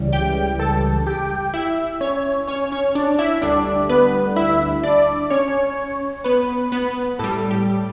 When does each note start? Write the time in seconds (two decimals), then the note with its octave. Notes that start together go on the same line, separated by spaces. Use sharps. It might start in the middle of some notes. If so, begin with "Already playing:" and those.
Already playing: C#2 C#3 E3 G3
0.13 G4 G5
0.59 A4 A5
1.07 G4 G5
1.54 E4 E5
2.01 C#4 C#5
2.47 C#4 C#5
2.72 C#4 C#5
2.95 D4 D5
3.19 E4 E5
3.42 D2 D3 G3 D4 D5
3.89 B3 B4
4.36 E4 E5
4.83 D4 D5
5.30 C#4 C#5
6.24 B3 B4
6.72 B3 B4
7.19 A2 G3 A4
7.51 G4